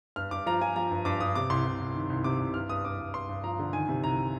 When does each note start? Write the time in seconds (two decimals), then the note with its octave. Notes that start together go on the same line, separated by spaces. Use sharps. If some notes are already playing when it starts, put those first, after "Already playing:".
0.16 G2 F6
0.31 G2 D6
0.46 F3 A#5
0.61 F3 G#5
0.76 F3 A#5
0.91 G2
1.05 G2 D6
1.20 G2 D#6
1.35 C3 D6
1.50 C2 C6
1.65 C2
1.80 C2
1.94 D#3
2.10 C2
2.24 C3 D6
2.40 C2
2.54 G2 F6
2.69 G2 D#6
2.84 G2 D6
2.99 G2
3.14 G2 C6
3.29 G2
3.44 F3 A#5
3.59 D3
3.73 D#3 G#5
3.88 C3
4.03 C2 A#5